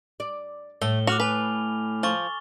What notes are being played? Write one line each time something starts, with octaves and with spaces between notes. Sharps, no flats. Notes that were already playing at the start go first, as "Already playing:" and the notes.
D5
A2 A3 G7
F#4 D6 F6 F7
B4 G#5 F7
F3 C#6 A6 G7